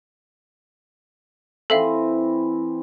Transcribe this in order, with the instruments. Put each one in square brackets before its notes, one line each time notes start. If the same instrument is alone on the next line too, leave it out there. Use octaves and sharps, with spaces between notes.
[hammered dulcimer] E3 C4 [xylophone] A4 E5 F5